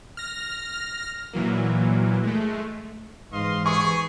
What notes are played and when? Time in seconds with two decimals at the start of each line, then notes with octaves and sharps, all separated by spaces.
0.17 F6 A#6
1.33 A#2 E3 F#3 A#3
2.24 G#3 A3
3.33 G#2 E3 D#5 F5 C6
3.66 B3 G#4 C#6